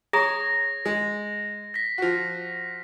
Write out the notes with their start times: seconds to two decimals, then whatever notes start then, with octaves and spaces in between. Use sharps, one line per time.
0.13 G#4 C#5 A#5 D#6 A#6
0.85 G#3
1.74 A#6 B6
1.98 F3 F#4